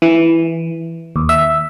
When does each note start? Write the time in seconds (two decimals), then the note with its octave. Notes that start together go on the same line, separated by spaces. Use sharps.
0.02 E3
1.16 D#2
1.29 E5